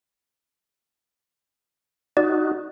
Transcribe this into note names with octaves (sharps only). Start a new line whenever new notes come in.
D#4 F#4 D5